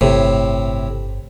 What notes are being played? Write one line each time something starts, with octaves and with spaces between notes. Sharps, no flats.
G1 A2 C3